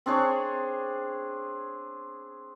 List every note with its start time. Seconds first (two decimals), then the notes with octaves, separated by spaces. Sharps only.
0.06 C4 D4 G#4 C#5